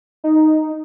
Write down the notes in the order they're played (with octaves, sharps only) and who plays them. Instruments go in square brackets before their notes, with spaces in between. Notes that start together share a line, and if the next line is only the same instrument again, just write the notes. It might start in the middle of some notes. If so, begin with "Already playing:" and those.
[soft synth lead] D#4